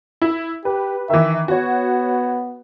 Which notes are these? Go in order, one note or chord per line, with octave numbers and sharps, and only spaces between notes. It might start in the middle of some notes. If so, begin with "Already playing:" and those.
E4
G4 B4
D#3 E3 E5
B3 F#4 C#5